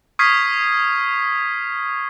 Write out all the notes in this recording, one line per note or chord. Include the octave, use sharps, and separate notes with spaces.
C#6 D#6 F6 G#6 B6 C7